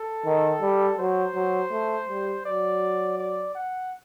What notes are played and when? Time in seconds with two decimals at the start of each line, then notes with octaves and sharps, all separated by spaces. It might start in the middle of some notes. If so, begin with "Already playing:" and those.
Already playing: A4
0.25 D#3
0.61 G3
0.98 F#3 C5
1.35 F#3
1.71 A3
2.08 G3
2.45 F#3 D5
3.19 D5
3.55 F#5